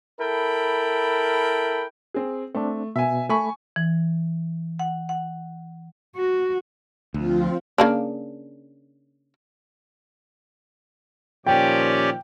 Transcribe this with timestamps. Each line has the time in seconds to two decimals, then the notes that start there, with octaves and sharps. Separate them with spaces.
0.21 E4 A4 A#4 G5 B5
2.14 C4 G#4
2.55 A3 C4 D4
2.96 B2 E5 G#5
3.29 A3 G#5 B5 C#6
3.76 E3
4.79 F#5
5.09 F#5
6.16 F#4
7.14 D2 F3 C4 F4
7.78 C#3 A#3 D4
11.47 A#2 D#3 F3 C#4 G4 D5 G5